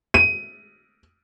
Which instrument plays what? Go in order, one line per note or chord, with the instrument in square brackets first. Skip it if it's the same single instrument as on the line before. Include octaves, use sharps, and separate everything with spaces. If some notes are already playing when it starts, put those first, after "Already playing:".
[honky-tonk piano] D#7